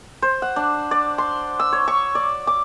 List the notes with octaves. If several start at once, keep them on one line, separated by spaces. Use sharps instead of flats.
C5
F#5
D4
D5
C6
E6
C#5
C#6
D5
D6